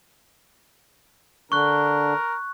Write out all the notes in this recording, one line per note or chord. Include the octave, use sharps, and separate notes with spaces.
D3 D4 A#4 C#6 F#6